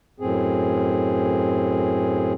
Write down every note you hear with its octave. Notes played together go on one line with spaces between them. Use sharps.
F#2 A2 C4 G#4